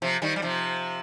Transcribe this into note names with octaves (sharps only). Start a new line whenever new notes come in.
C3 F3
D#3 G3
G3
C3 F3